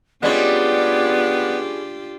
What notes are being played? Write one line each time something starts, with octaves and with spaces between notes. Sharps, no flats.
G3 G#3 B3 C#4 D4 F4 G4 D5